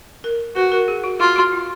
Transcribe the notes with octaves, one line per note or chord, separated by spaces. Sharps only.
A#4
F#4 B4
A#4
G#4
F#4
F4 F#4
F#4
F4